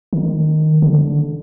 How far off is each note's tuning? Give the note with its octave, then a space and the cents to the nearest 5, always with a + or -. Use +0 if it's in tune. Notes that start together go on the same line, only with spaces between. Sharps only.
D#3 -5
D3 -5